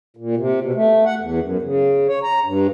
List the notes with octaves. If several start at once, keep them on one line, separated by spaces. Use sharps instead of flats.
A#2
C3
B2
A3
F#5
E2
F#2
C#3
C#5
A#5
G2